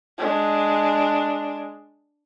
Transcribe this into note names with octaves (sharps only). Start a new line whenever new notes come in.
G#3 D4